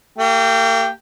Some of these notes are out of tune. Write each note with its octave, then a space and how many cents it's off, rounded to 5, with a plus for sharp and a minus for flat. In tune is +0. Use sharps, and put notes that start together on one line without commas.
A#3 -40 G4 +0